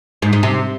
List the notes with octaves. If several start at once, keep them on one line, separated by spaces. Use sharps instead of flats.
G#2
G#2
C3